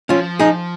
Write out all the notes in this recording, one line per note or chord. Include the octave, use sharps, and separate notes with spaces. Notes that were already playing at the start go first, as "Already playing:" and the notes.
F3 C#4 F4
D#4 G#4